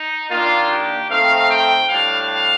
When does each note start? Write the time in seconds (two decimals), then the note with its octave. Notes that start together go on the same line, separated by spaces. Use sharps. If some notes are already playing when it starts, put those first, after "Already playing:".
Already playing: D#4
0.31 D#3 A#3 D4 F4
0.70 G4
1.10 D#3 A3 C4 F5
1.50 G5
1.89 A2 G3 D4 F5